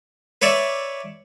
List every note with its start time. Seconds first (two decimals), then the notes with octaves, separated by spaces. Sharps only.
0.42 B4 C#5 D5 E5